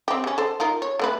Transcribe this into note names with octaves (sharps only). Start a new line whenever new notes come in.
C4 G4
C#3 C#4
A4 C5
D#4 F4 A#4
C#5
A3 B3 B4